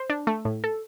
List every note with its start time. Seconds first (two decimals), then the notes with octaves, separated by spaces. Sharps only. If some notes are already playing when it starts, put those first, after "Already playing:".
Already playing: C5
0.10 D4
0.27 A3
0.45 A2
0.64 A4